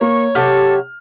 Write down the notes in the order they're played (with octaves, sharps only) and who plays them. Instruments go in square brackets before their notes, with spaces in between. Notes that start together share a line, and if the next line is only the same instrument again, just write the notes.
[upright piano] A#3 [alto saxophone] C#5 [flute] C#6
[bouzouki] C3 F#3 G4 [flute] A4 [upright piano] F6